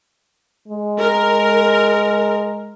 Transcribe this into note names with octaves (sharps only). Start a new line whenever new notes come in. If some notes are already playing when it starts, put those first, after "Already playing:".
G#3
A#4